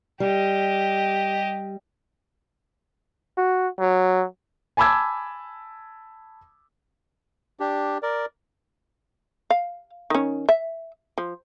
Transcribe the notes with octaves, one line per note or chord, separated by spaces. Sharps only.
G3 G4 D#5
F#4
F#3
G#5 A5 B5 D6 E6 G#6
D4 G4
A#4 D5
F5
D#3 C#4
E5
F3